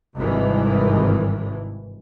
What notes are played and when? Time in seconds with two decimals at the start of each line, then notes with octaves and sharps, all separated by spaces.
0.17 G#1 G2 C3 D#3 E3